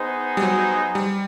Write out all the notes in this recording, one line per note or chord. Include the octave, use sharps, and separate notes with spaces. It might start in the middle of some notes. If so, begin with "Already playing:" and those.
Already playing: B3 D#4 G#4 C5
G3
F#3
G3